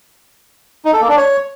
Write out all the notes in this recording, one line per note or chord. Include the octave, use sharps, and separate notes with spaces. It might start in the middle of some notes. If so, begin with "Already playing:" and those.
D#4
A4
A#3
D4
C#5